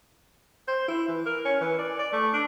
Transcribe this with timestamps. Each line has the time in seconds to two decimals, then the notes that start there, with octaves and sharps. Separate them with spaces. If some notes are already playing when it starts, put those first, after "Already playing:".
0.68 C5
0.88 E4
1.08 E3
1.26 A#4
1.45 C#4
1.61 E3
1.79 D5
1.99 D5
2.13 A3
2.33 D4